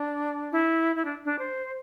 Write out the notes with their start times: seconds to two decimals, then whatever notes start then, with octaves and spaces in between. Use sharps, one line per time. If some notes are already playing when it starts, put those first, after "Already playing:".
Already playing: D4
0.52 E4
0.95 E4
1.05 D4
1.24 D4
1.39 C5